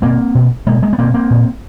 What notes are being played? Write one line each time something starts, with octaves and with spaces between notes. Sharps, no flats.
B2 A#3 C4
B2
B2 G#3 A#3
G#3 A#3
B3
B2 A#3 C4
A#3 C4
A#2